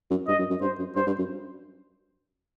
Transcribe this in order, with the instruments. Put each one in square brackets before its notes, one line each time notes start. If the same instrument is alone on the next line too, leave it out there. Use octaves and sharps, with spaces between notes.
[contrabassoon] F#2
[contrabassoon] G2 [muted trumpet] D#5
[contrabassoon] F#2
F#2
[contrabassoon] G2 [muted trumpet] C5
[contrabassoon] F#2
[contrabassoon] G2 [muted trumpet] C5
[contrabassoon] G2
F#2